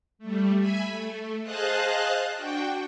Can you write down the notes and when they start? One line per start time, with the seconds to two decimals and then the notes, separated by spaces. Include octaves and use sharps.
0.19 G3 A3
0.57 E5 G#5 B5
0.88 A3
1.42 G#4 C5 D#5 F5 A5 F#6
2.34 D4 F#4 G5